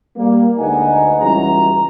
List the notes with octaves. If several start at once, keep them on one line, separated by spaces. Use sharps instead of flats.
G3 A#3
D2 G#3 D#4 B4 F#5 G#5
C#2 B2 E3 G3 C#4 A#5